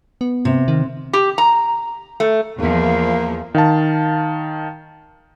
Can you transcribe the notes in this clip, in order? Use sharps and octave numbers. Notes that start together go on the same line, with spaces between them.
B3
C3
D#3
G4
A#5
A3
E2 F3 A#3
D#3 F5 A5